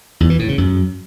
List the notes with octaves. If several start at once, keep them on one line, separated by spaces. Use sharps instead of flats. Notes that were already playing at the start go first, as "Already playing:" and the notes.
E2
E3
A2
C#3
F#2